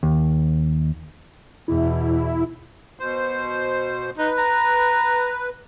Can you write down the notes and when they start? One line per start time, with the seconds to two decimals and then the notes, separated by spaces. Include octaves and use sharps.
0.03 D#2
1.68 E2 B2 E4
3.00 B2 C5
4.18 D#4 B4
4.38 A#5